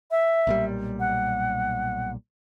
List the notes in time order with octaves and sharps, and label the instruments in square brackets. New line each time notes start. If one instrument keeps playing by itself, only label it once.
[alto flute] E5
[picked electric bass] B1 A#2 G3
[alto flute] F#5